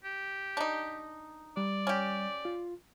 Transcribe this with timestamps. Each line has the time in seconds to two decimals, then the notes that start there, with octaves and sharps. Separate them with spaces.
0.05 G4
0.57 D4 D#4
1.57 G3 D5
1.87 C#4 G4
2.45 F4